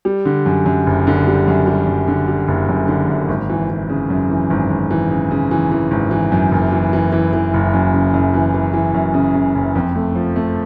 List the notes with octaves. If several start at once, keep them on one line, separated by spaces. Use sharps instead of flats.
G3
D3
F#2
F#2
F#1
D3
G3
F#2
G3
F#2
D3
G3
F#1
F#2
D3
F#2
G#1
E3
E3
C#3
F#2
E3
G#1
G#1
E3
C#3
C#3
E3
E3
G#1
E3
F#2
F#1
E3
E3
E3
E3
F#1
F#2
C#3
F#2
E3
E3
E3
F#2
C#3
C#3
F#1
F2
A3
F3
A3